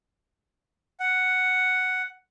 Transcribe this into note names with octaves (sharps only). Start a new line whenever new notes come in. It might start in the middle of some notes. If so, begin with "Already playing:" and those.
F#5